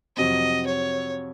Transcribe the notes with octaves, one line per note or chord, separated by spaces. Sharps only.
F2 C3 F#3 C4 D#5
C#5